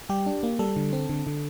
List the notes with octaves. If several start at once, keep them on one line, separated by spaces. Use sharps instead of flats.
G3 G4
D4
A#3
G3 A4
D3
C4
D3
D3